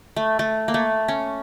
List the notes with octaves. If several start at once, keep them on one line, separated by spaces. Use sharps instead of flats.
A3
A3
A#3
A3
C#4